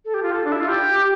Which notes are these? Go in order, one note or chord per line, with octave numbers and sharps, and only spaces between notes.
A4
G4
F4
A4
D4
E4
F4
G4